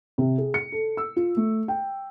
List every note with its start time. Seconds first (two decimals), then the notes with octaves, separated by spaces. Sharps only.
0.18 C3
0.38 G#4
0.54 C#7
0.72 A4
0.97 E6
1.16 F4
1.37 A3
1.68 G5